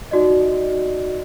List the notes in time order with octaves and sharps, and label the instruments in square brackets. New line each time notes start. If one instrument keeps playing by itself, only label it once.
[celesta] D#4 F#4 D5 D#5